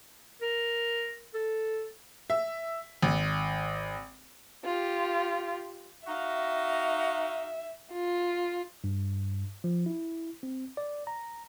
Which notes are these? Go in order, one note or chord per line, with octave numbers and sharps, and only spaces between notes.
A#4
A4
E5
G#1
F4 G4
D#4 F#4 E5 F5
F4
G2
F3
E4
C4
D5
A#5